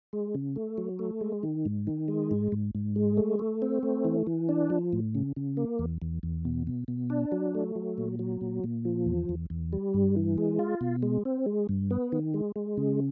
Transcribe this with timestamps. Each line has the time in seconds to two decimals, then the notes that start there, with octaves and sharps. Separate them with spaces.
0.13 G#3
0.35 C#3
0.56 A3
0.78 F#3
0.99 A3
1.21 G#3
1.43 D#3
1.65 G#2
1.87 D#3
2.08 G#3
2.31 G#2
2.52 G#2
2.75 G#2
2.96 G#3
3.17 A3
3.39 A3
3.62 C4
3.83 A3
4.05 E3
4.27 E3
4.49 D4
4.70 F3
4.93 A2
5.15 C#3
5.36 C#3
5.57 A#3
5.79 E2
6.02 E2
6.23 E2
6.45 B2
6.67 B2
6.88 B2
7.10 D4
7.32 F#3
7.55 A3
7.76 F#3
7.98 A#2
8.19 F#3
8.41 A#2
8.64 A#2
8.85 F3
9.06 E2
9.29 E2
9.50 E2
9.73 G3
9.94 G2
10.16 E3
10.38 G#3
10.59 F4
10.81 B2
11.03 G#3
11.25 C4
11.46 G#3
11.69 G2
11.91 B3
12.12 D#3
12.34 G#3
12.56 G#3
12.77 C#3